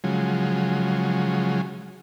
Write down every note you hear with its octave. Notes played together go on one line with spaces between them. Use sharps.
C#3 F3 F#3 G#3